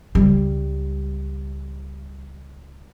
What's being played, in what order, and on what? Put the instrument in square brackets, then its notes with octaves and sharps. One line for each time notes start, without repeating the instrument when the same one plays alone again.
[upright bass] C#2 G3